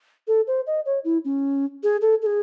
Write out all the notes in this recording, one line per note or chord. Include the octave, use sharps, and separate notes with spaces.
A4
C5
D#5
C#5
E4
C#4
G#4
A4
A4
G#4